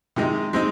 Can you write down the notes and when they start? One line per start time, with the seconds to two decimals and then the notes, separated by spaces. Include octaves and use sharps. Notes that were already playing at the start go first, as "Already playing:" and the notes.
0.16 C3 D#3 G#3 D#4
0.53 G#3 C4 D#4